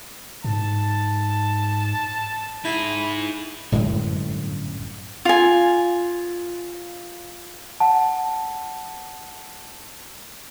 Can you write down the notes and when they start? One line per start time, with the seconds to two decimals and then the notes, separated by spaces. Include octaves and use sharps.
0.44 G#2 A5
2.65 D#4 E4 G#4
3.72 G1 F#2 A2 G#3
5.25 F4 G#5
7.80 F#5 A5